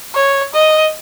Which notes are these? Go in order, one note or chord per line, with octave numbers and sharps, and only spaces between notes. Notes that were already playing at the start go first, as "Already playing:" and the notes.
C#5
D#5